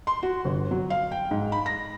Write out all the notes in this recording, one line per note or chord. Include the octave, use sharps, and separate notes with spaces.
C6
F#4
G1
F#3
F5
G5
G#2
B5
A#6